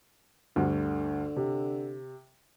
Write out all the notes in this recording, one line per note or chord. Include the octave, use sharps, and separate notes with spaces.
D2 G2 D3
C3